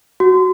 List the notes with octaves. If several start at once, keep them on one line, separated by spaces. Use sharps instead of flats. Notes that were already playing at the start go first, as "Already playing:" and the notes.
F#4